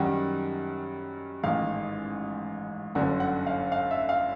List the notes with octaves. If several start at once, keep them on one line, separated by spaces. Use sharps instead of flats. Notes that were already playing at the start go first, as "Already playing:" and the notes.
Already playing: F#2 D#3 G3 F#5
A1 G#2 D#3 F5
G1 F#2 D3 F#5
F#5
F5
F5
E5
F5